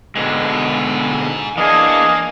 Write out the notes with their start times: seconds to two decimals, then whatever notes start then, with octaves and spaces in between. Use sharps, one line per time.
0.16 B2 D3 G#3 D#4 G#4
1.57 E3 A#3 D4 G#4 D#5 F5 G#5